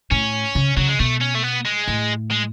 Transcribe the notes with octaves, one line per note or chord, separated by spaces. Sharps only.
A2 C#4
C#3
C#3 F#3
G#3
B2 A3
C#4
A3
B3
G#3
A2
G#3